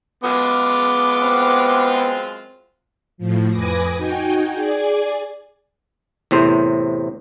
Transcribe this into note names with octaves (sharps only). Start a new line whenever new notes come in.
F#2 G#3 B3 F4 D6
C4
A2 F3
F2 B4 G#5 D6 D#6 A#6
D#4 F#4 G5 G#5
G#4 D5 G#5
E2 A2 C3 C5